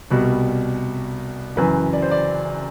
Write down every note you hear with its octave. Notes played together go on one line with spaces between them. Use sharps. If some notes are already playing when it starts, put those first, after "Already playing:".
C2 B2 G3
F#1 F#2 E3 B4
D5
C5
D5